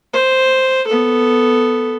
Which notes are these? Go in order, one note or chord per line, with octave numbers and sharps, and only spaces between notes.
C5
B3 A4